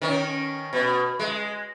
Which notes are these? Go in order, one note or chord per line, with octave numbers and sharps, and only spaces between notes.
D#3 C#4
B2
G#3